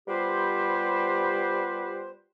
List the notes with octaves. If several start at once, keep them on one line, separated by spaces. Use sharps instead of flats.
G3 B3 F4 G4 B4 C5